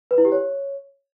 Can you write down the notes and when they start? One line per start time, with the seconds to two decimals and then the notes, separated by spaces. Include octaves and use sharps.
0.11 B4
0.18 E4
0.25 G4
0.32 C#5